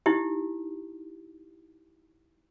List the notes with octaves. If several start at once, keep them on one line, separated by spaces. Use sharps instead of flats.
D#4 E4 G4